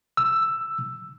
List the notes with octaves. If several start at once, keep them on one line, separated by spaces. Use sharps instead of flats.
E6